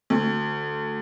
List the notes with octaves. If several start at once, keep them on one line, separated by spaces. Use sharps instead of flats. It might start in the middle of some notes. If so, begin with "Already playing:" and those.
D2